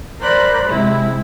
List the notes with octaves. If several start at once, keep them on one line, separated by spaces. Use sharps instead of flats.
A#4 C5 D5 B5 F#6
C3 G#3 E4